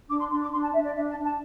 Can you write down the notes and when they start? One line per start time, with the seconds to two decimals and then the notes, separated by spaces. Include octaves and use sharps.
0.09 D4 D6
0.19 C6
0.30 D4 C6
0.41 D6
0.52 D4 C6
0.62 A5
0.73 D4 E5
0.84 D5
0.95 D4 E5
1.10 A5
1.17 D4
1.24 A5